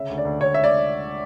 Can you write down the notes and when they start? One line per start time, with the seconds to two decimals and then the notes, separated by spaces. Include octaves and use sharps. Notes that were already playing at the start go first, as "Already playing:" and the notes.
Already playing: C#3 E5
0.10 D2
0.18 D5
0.25 D2
0.40 D2 C#5
0.54 E5
0.64 D5